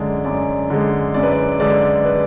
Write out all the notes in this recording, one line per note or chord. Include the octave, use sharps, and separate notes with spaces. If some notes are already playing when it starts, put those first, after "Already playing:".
Already playing: F#2 D3 G#3 D5
F#2 D5
D3 G#3
F#2 D5
B4
D5
D3 G#3 D5
B4